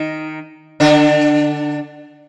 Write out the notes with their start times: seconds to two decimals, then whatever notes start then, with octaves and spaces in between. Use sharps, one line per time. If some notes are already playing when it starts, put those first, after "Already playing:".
Already playing: D#3 D#4
0.80 D3 D4